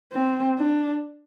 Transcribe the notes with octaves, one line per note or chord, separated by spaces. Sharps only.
C4
D4